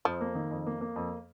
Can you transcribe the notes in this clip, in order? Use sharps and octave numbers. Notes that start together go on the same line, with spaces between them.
F2 F3
A#3
D#3
F2
A#3
A#3
F2